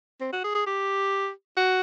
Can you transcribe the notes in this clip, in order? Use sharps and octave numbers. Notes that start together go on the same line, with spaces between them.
C4
F#4
G#4
G#4
G4
F#4